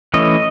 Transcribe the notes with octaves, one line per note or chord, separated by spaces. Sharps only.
E3 A3 C#4 D#5